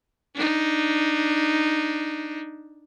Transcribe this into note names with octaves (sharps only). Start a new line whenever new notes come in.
D4 D#4